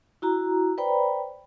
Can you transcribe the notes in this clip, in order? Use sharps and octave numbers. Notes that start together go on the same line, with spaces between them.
E4 F#4 A#5
B4 C5 D5 G5 A#5 B5